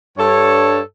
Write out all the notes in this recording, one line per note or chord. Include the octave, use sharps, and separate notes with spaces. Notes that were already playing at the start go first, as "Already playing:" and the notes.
G2 A4 C#5